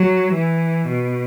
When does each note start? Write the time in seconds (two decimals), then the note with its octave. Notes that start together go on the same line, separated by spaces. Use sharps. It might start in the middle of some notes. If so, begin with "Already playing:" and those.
Already playing: F#3
0.34 E3
0.88 B2